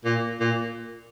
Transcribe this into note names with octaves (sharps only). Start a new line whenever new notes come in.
A#2
A#2